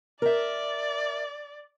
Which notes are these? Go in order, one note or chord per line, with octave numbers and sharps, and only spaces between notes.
A#4 D5 E5